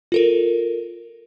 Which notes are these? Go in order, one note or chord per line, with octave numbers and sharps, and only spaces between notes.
F4 A4 A#4